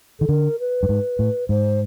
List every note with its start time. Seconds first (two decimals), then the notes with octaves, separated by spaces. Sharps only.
0.19 D#3 A4
0.29 D3 A#4
0.59 B4
0.83 G2
0.89 G#2
1.19 A2
1.49 G#2 C5